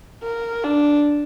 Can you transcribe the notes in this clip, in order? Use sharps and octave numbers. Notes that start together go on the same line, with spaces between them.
A#4
D4